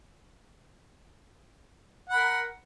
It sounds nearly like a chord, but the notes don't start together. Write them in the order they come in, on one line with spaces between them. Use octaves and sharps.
F#5 B5 A#4